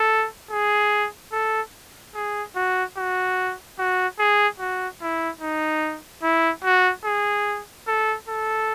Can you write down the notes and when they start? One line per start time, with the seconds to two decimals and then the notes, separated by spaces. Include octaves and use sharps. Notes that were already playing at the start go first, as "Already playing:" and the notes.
Already playing: A4
0.51 G#4
1.32 A4
2.15 G#4
2.55 F#4
2.97 F#4
3.79 F#4
4.19 G#4
4.59 F#4
5.01 E4
5.41 D#4
6.23 E4
6.64 F#4
7.05 G#4
7.87 A4
8.28 A4